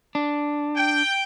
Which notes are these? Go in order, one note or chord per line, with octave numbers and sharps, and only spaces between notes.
D4
G5